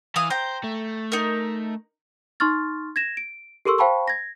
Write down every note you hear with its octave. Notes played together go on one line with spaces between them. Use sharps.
E3 F5 D#6
C5 G5 A#5
A3
D#4 A#4
D#4 C6 C#6 F6 A6
G#6 A#6 E7
D7
G4 A4 A#4 C6 C#6 E6
C5 F5 G5 A5 B5 C#6
G#6 A#6